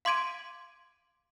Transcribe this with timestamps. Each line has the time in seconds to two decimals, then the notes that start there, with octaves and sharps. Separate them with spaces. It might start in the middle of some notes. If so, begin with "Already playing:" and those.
0.05 F5 C6 D6 G#6 D7 D#7